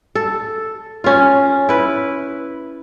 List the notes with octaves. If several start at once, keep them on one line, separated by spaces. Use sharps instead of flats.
A4
C#4 F4
E4 B4